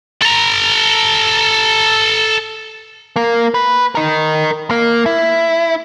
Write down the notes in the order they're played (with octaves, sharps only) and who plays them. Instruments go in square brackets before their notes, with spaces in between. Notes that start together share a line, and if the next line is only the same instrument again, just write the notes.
[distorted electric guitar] A4 A#5
[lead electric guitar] A#3
B4
A#4 D#5
A#3
E4